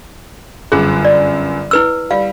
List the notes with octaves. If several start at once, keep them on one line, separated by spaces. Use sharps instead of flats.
G1 F#2 G#4 F#6
D5
E4 B4 E6
G3 F5